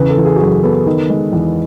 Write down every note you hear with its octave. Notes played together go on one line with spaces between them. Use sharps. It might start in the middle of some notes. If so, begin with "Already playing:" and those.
Already playing: E2 C#3 B4
A4
E3
G#4
F#4
F#2 G#4
B3 A4
D#3
G#3
E2